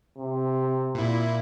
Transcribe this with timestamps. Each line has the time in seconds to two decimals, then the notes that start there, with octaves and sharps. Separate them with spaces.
0.18 C3
0.95 A#2 E4